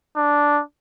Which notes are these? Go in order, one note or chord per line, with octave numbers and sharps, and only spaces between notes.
D4